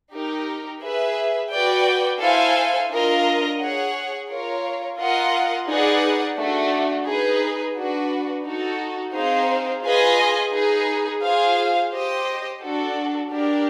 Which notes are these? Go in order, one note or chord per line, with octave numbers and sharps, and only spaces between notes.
D#4 G4 A#4
G#4 B4 E5
F#4 B4 D5 G5
E4 A4 C5 F5 G#5
D4 F4 A#4 D#5
G#4 C#5 F#5
F4 A#4 C#5
F4 A#4 D#5 F#5
D#4 G#4 B4 D5 F#5
A3 D4 F#4
D#4 G#4 B4
D4 F#4 B4
D#4 F#4 A4
C4 D#4 G#4 C5 F5
F4 G#4 B4 D#5 G#5
D#4 G#4 B4
F4 G#4 C5 F5
G4 C5 D#5
D4 F#4 A4
D4 G4 A#4